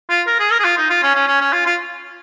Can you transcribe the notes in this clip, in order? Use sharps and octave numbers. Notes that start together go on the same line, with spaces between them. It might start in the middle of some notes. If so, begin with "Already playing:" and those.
F4
A#4
G#4
A#4
G#4
F4
D#4
F4
C#4
C#4
C#4
C#4
F4
F4